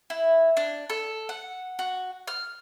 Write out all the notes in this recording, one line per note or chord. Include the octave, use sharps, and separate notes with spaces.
E4
D4
A4
F#5
F#4
F6